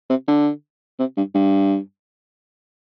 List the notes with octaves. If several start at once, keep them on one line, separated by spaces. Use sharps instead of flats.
C3
D3
C3
G2
G2